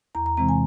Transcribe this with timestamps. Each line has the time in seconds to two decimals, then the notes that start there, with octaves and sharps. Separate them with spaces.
0.15 E2 A#5
0.26 A#5
0.37 C3 E3 G#3 C4 A#5
0.49 G#5